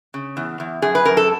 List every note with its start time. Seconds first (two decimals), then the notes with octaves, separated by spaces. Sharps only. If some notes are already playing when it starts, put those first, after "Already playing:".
0.14 C#3
0.37 E2
0.60 E2
0.82 F#2 G#4
0.95 B4
1.05 F#2 A#4
1.17 A4